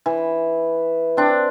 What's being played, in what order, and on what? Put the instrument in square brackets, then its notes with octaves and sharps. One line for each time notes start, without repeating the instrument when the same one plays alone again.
[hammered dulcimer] E3
C4 D4